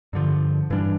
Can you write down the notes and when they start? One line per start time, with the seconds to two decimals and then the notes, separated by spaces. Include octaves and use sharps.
0.13 G2 D3 F3
0.70 G2 E3 G3 D4